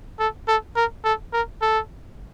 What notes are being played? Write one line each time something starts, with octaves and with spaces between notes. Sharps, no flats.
A4
A4
A#4
A4
A#4
A4